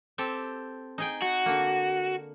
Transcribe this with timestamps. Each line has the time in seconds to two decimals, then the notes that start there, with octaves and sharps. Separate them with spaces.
0.18 C4 G4 A4
0.98 D#4 G#4 G5
1.22 F#4
1.46 D3 A#3